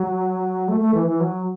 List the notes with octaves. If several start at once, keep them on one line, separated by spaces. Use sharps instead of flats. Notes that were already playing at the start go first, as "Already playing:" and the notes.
Already playing: F#3
A3
A3
E3
E3
F#3